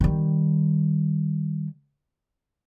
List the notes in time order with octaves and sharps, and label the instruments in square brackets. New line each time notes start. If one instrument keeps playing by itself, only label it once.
[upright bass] D#3 G3